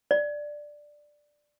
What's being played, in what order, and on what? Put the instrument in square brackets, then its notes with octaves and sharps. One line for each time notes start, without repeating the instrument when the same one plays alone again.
[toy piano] D5